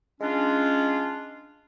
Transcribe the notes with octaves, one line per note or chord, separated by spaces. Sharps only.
G#3 C#4 D4 F4